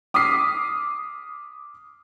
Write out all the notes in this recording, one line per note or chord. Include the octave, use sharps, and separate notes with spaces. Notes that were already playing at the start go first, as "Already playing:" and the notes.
D6 D#6 F6 B6 C7